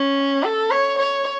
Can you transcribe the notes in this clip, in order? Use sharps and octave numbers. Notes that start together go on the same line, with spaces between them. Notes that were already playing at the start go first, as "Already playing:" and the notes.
Already playing: C#4
A4
C#5
C#5